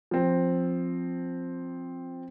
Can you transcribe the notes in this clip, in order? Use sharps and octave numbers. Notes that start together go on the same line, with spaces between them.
F3 C4